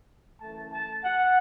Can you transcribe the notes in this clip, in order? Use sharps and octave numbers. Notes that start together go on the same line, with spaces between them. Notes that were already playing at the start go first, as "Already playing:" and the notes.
F#2 E3 A3 A5
A5
F#5